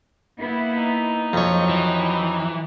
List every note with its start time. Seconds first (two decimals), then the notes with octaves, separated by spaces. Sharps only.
0.39 A#3 B3 E4
0.76 D#4
1.33 F2 F#3 C#5
1.69 E3